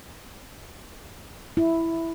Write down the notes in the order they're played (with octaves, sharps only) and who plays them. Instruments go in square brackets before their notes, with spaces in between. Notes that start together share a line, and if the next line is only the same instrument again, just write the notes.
[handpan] E4